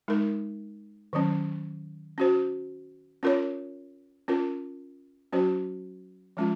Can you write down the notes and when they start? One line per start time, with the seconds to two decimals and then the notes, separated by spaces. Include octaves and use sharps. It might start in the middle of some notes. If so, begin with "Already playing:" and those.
0.08 G#3 D#4 A#4
1.13 D#3 F#3 C#4
2.18 C#4 F#4 C5
3.23 C#4 F4 A#4 C#5
4.28 C#4 F4 A#4
5.33 F#3 C#4 F#4 C5
6.37 F3 G#3 C#4 F4